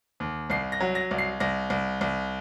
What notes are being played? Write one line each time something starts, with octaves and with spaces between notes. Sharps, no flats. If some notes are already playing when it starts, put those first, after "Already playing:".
D#2
C2 C7
A#6
F#3
A#6
C2
C7
C2 A#6
C2
C2